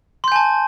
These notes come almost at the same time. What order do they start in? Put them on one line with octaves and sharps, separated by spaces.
C6 G6 G#5 A5